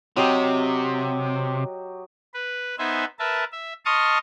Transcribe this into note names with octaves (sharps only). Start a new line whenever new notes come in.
C3 F#3 G4 D#5
B4
B3 D#4 B4 C5 E5 G#5
A#4 B4 E5 A5
E5
D#5 A5 C6 C#6 D#6 F6